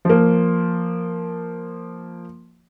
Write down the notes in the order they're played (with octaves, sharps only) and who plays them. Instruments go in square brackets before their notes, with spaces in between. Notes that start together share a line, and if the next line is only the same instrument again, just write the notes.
[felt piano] F3 A#3